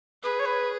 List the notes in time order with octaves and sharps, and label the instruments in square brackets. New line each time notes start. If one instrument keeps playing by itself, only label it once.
[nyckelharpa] G#4 [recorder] B4
[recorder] C#5
B4